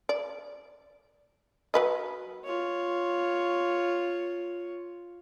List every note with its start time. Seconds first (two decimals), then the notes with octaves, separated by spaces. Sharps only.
0.09 D5
1.74 F#3 B4 D#5
2.45 F4 C#5